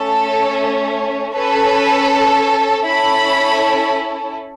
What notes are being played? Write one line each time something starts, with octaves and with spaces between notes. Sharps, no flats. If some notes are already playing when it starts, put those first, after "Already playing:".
Already playing: A3 C#4 A4
C#4 A4 B4
C#4 E4 A4 B5